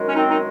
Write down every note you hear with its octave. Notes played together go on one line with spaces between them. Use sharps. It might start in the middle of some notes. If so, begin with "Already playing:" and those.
Already playing: F#2 D#3 G#3
C#4
C4 D#4
D#4